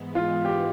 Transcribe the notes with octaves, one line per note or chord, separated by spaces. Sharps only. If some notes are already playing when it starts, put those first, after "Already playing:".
Already playing: G#2 E3 G#3 B3
F4
G4